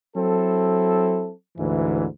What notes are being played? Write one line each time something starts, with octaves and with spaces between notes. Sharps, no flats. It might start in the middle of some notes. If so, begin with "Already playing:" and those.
F#3 C4 E4 A4
D2 G#2 E3